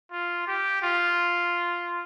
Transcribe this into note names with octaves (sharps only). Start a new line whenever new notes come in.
F4
G4
F4